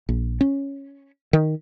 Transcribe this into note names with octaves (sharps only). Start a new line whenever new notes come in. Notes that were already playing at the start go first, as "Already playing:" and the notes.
A#1
C#4
D#3